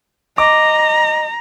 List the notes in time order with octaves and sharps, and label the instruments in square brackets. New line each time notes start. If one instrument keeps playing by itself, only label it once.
[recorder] D#5 [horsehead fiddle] A#5 [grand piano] D6